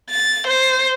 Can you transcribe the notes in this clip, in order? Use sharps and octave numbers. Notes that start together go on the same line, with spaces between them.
A6
C5